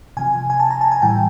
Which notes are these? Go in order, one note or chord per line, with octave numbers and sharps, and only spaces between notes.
C3 F3 G#5
G#5
A5
A#5
A5
G#5
A2 E3 G3 G5